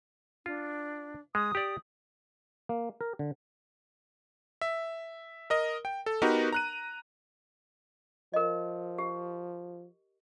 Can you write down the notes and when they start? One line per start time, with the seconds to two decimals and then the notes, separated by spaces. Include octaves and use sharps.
0.46 D4 F4
1.35 G#3 D#6
1.55 G4 D5
2.69 A#3
3.01 A#4
3.19 D3
4.61 E5
5.50 A#4 D#5
5.85 G5
6.06 A4
6.22 B3 D#4 F#4 G4 A#4 B4
6.53 A#5 F#6 D#7
8.34 F3 A#4 D#5
8.98 G4